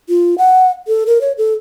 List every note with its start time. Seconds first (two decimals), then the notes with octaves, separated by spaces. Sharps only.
0.09 F4
0.38 F#5
0.88 A4
1.07 A#4
1.21 C#5
1.38 A4